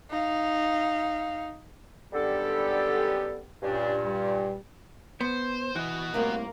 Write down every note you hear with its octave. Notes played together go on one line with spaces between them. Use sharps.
D#4 F5
F#2 D3 G3 B3 G4 A4
G2 A#2 C#4 D4 G4
G3
B3 C5
E3 F#4 D#5
C2 A2 C3 A#3